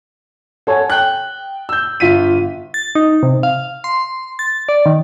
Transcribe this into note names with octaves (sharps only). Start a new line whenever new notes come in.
A4 C#5 F#5 G#5
G5 F#6
E6 G6
G1 F4 B6 D#7
A6
D#4
C3
F5
C6
A6
D5
D#3